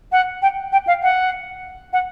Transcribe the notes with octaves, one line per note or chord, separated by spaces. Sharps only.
F#5
G5
G5
F5
F#5
F#5